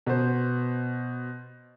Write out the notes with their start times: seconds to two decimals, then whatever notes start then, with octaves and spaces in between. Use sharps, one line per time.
0.07 B2 C5